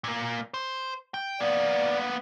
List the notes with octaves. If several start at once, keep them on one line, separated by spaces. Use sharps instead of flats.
A#2 A#3
C5
G5
A#3 B3 D5